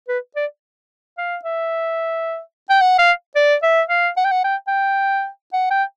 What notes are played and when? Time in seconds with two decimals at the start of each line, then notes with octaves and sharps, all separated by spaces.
0.09 B4
0.36 D5
1.18 F5
1.45 E5
2.70 G5
2.81 F#5
2.99 F5
3.36 D5
3.63 E5
3.90 F5
4.17 F#5
4.25 G5
4.31 F#5
4.44 G5
4.68 G5
5.53 F#5
5.71 G5